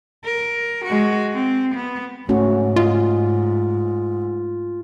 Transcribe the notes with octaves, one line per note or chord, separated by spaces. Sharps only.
A#4
G#3 F#4
C4
B3
G#2 A3 C#4 F#4
F4 D#5